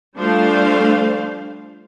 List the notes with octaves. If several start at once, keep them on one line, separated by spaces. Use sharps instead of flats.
F3 G3 A3 D4 C5 F5